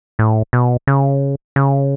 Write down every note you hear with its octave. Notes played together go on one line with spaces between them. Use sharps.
A2
B2
C#3
C#3